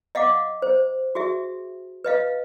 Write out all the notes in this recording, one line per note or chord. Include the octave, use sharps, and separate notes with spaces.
D#5 F5 F#5 D6
C5
F#4 G#4 E5
B4 D#5 F5